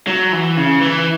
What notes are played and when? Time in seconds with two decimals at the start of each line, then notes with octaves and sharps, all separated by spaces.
0.07 F#3
0.33 E3
0.57 C#3
0.81 E3